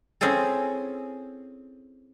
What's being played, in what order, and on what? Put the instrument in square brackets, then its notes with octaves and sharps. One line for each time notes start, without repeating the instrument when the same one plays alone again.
[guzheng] C4 C#4 E4 G#4 A4